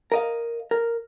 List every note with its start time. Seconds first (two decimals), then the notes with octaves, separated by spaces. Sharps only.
0.12 A#4 D#5 F5
0.71 A#4